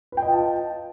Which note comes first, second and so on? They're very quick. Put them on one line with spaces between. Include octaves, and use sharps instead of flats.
B4 G5 D#5 F4 A5